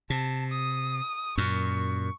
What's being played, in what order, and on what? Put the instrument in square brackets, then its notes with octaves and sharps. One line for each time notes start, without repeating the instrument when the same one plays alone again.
[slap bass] C3 [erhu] A5
[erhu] D#6
[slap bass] F#2 A#2 [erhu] C#6